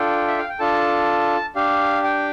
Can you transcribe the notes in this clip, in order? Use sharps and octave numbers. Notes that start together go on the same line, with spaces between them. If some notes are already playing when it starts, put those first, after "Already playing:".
Already playing: D4 F4 A4 G5
E5
F5
G5
D4 F4 A4 A5
D4 G4 F5
G5